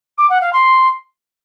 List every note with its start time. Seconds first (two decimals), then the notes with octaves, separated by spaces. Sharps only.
0.18 D6
0.29 F#5
0.41 F5
0.52 C6